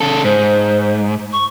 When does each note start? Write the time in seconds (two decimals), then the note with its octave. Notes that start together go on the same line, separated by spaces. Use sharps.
0.01 C#3 A4
0.24 G#2 C5
1.33 C#6